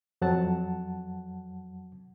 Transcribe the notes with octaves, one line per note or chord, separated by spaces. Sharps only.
F2 F#3 F#5 A5